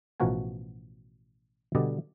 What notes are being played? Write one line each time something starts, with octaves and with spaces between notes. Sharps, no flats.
A1 B2 F3 F#4 A#4 G#5
B2 D3 G3 D5 D#5